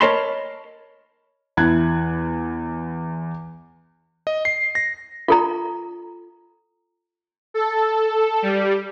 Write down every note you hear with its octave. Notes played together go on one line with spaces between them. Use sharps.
A#4 C#5 D#5 A5 B5 C6
E2 E4 F#6 G#6
D#5
C7
A#6
F4 A4 A#5
A4
G3